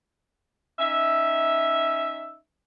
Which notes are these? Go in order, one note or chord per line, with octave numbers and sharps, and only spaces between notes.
C#4 D#4 E5